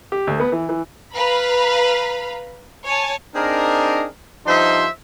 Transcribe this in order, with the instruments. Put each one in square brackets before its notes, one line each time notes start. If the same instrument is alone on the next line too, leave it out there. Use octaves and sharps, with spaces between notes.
[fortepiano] G4
D2
B3
E3
E3
[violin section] B4 F5 A#5 B5
C#5 G#5 A5
[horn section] C4 D4 D#4 G#4 A#4
G2 F3 D#4 C5 E5 C6